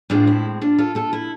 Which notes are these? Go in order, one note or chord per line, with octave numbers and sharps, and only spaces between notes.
A2 G#3 C4 D4 F4
E4
D4 F4
F4 A4
F4 A4
E4